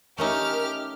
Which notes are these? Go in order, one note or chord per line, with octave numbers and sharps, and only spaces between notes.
A3 C#4 D#4 G4 A#4 F6